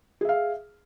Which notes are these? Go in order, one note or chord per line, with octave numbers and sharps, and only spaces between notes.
G#4 E5 F5